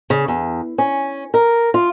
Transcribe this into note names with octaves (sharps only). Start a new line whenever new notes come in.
C#3
E2
C#4
A#4
F4